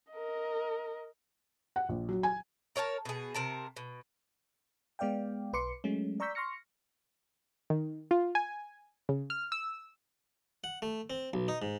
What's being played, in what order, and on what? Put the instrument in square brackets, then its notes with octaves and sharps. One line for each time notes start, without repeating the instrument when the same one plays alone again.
[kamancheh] A#4 D#5
[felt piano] F#5
A#1
F#3
G#5
[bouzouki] A#4 C#5 G5 A5
B2 G#4
C3 A#4 A5
B2
[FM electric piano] G#3 B3 D5 F5 G5
B1 B4 C6 D6 C#7
F#3 G#3 A3 C#4
D5 A#5 C#6 E6 G6 B6
C6 C#6 F6 A#6 C#7
[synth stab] D#3
F4
G#5
C#3
F6
E6
[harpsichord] F#5
A3
C4
B1
D#4
G#2